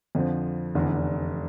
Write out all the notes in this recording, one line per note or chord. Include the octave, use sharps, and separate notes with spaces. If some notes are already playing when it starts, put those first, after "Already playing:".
F2 D3 F3
F1 E2 D3